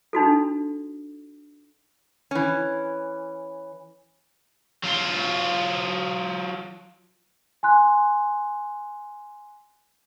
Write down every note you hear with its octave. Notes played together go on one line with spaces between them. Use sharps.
D4 D#4 F#4 A4
E3 C#4
F#3 F4
G#5 C6 F#6